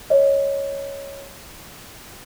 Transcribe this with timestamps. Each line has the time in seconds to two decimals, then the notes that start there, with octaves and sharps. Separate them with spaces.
0.10 C#5 D#5